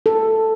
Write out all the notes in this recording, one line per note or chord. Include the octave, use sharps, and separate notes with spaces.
A4